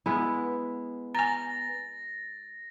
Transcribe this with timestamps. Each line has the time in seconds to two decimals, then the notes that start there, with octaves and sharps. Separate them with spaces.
0.06 G#3 B3 E4
1.15 G#5 A#5 A6 A#6